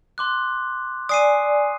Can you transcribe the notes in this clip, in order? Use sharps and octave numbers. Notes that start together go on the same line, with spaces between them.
C6 D6 F#6
D5 G#5 D#6 C7 D#7